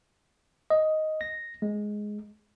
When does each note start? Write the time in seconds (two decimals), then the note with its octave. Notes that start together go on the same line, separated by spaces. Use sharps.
0.70 D#5
1.21 A#6
1.62 G#3